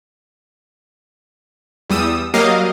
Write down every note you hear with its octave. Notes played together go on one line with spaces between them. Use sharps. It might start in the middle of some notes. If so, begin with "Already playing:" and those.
E2 G3 D#6 E6
F#3 G3 A#3 D#5 F5